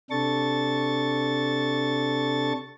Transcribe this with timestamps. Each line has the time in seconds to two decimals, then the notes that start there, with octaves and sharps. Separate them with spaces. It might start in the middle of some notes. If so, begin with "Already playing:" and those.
0.11 C3 D4 A4 C#6 A6